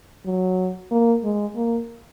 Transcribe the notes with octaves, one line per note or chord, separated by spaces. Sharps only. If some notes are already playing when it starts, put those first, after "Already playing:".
F#3
A#3
G#3
A#3